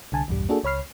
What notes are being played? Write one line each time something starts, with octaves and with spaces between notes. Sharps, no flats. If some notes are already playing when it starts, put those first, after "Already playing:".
C2 D3 G#5 A5
B1 E2 G2 G3
A#3 D4 F#4 G#4 A4
C#2 C#5 B5 F6 C7